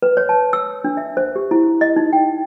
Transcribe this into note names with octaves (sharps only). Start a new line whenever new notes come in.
B4
C#5
A5
E6
D4
E5
C5
G4
E4
D#5
D#4
G5